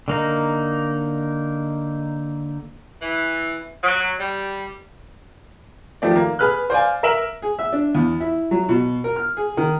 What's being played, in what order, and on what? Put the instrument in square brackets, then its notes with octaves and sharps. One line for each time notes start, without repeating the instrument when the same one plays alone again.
[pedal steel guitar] D3 A#3 D#4
[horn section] E3
F#3
G3
[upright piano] D#3 F3 A3 D5
A#3
G#4 B4 F6 F#6
C5 D5 F5 G#5
A#4 E5 E7 F#7
[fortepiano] G#4
E5
D4
E2
E4
F#3
B2
A#4
F6
G#4
D#3